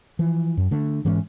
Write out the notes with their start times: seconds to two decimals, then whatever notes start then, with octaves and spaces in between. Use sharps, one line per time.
0.19 E3 F3
0.57 F#2
0.71 D3 A3
1.05 G#2 E3 G#3 C#4